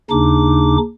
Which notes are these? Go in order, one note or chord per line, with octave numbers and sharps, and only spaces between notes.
D#2 C#3 D4 D#4 D6